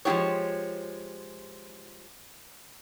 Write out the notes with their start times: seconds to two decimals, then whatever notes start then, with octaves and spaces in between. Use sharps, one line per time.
0.05 F3 G#3 B3 F4 G4 C#5